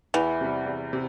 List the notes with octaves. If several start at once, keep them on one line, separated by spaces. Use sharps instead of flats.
E2 E3
C3 G3
E2
C3